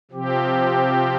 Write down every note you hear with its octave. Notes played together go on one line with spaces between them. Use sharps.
C3 F3 C4 G4